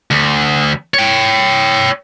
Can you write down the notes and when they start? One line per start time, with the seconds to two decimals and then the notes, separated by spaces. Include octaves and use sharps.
0.11 D2
0.94 C#5 G5